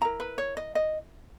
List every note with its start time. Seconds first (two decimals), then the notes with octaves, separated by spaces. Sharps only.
0.01 E4 A#4 A#5
0.20 B4
0.38 C#5
0.57 D#5
0.75 D#5